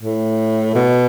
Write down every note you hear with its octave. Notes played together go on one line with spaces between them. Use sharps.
A2
B2